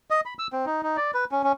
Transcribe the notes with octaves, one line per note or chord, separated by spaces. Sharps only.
D#5
B5
E6
C4
D#4
D#4
D5
B4
C#4
C#4